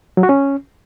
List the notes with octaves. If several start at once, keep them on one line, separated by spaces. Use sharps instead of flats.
F#3
F#4
C#4